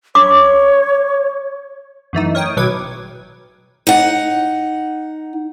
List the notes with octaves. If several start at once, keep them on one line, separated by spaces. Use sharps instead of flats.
C#5 D6
F#2 E3 A3 D#4
A#4 C#5 G5 D#6
G#1 B2 F#3 B4 D6 G#6
D#4 F#5